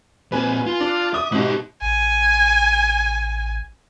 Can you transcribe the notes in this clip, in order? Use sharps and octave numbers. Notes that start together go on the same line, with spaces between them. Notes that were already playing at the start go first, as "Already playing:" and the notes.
A#2 C4 B4 G#5
F4
D4
E5 D6 D#6
G#2 B2 E4 G4
A1 G#5